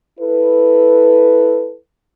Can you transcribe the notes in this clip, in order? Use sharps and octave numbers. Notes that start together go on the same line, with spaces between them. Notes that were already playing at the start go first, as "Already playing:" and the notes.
E4 A4 B4